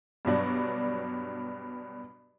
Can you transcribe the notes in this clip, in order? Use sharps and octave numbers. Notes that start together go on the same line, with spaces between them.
G2 B2 F#3 D4